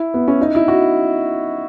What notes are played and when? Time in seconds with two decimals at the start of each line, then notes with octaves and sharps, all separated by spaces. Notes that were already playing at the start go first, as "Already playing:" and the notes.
Already playing: E4
0.14 B3
0.28 C#4
0.41 D#4
0.55 E4
0.68 F#4